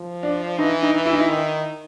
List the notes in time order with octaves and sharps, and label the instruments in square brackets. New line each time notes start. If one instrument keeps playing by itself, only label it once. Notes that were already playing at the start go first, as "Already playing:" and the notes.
Already playing: [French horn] F3
[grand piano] D4
[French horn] E3 [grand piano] D#4
[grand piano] D#4
[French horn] E3
[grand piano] E4
D#4
E4
[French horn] D#3